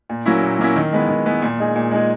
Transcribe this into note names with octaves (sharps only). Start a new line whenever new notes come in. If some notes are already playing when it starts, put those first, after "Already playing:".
A#2
F#3 A#3 C#4 E4
A#2
F#3 A#3 C#4 E4
D#3
G#3 B3 E4
D#3
G#3 B3 E4
A#2
G#3 D#4 G#4
A#2
G#3 D#4 G#4